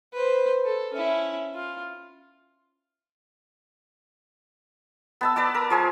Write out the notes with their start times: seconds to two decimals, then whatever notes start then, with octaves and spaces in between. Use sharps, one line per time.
0.13 B4 C5
0.64 A4
0.93 C#4 E4
1.55 F4
5.21 B3 A5 E6
5.36 B4 D5 A5 D6
5.55 A#4
5.70 F3 G#4 C#5